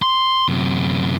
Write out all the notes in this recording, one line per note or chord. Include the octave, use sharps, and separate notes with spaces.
C6
F#2 C3